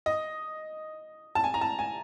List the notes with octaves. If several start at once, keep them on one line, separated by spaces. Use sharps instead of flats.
D#5
A5
G#5
A#5
A5
G#5